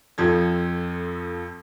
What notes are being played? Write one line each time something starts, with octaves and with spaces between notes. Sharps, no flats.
F2 F3 A4 G#6